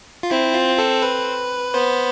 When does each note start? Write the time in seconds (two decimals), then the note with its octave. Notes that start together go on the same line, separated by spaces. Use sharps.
0.23 F4
0.30 C4 E4
0.54 F4
0.78 A4
1.02 B4
1.74 B3 C5